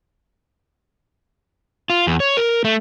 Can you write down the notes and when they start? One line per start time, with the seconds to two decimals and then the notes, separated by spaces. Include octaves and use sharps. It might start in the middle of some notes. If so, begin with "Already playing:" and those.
1.90 F4
2.07 E2
2.20 C#5
2.37 A#4
2.65 A3